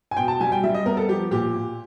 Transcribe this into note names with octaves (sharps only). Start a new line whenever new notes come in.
G#5
B2 G5
A5
G3 G#5
G5
G3 E5
D#5
B3 A#4
A4
F3 G4
A#2 G4
A#2